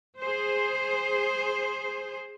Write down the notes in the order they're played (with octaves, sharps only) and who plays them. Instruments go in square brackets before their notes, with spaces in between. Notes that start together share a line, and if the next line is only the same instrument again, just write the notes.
[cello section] G#4 C5